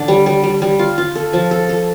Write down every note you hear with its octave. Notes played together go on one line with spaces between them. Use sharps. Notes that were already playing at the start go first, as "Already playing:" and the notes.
Already playing: D3 D4
G3
G3
G3
G3
F4
F4
A4
F3
A4
A4